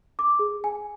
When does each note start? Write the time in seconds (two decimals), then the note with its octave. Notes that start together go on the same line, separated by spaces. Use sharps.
0.19 D6
0.39 G#4
0.64 G#5